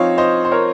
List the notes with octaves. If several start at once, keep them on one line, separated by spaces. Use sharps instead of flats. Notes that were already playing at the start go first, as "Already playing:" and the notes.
Already playing: F3 C4 D#4 C#5 F5
C5 D#5
C5
A#4 C#5